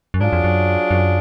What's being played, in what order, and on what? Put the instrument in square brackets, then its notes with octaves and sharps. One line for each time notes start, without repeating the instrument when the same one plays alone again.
[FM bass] F#2
[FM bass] G#2 [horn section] F#3 D4 F4 G#4
[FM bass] F2
F#2
F#2